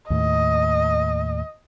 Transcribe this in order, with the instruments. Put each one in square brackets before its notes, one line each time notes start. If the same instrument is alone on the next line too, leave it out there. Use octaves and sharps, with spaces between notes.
[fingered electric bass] D#2 A2 [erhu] D#5